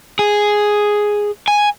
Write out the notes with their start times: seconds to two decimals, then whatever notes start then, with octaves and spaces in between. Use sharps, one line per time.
0.19 G#4
1.48 G#5